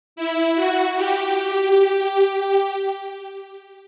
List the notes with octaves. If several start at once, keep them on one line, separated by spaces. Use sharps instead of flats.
E4
F#4
G4